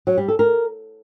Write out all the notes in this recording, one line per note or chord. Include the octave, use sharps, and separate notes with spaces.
F#3
G3
A4
A#4